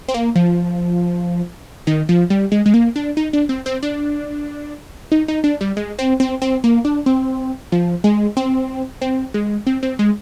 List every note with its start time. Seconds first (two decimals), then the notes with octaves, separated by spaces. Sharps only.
0.08 C4
0.14 A#3
0.36 F3
1.87 D#3
2.09 F3
2.30 G3
2.52 G#3
2.66 G#3
2.74 A#3
2.96 D4
3.17 D#4
3.33 D4
3.49 C4
3.66 C4
3.83 D4
5.12 D#4
5.28 D#4
5.44 D4
5.61 G3
5.77 G#3
5.99 C4
6.20 C4
6.42 C4
6.64 A#3
6.85 D4
7.06 C4
7.72 F3
8.04 G#3
8.37 C4
9.01 C4
9.34 G#3
9.67 C4
9.83 C4
9.99 G#3